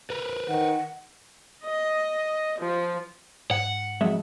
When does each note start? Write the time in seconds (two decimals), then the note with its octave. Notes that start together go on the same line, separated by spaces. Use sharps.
0.10 A#4 B4
0.49 D#3 F#5
1.64 D#5
2.61 F3
3.51 G#2 F#5
4.01 F2 F#3 G#3 E5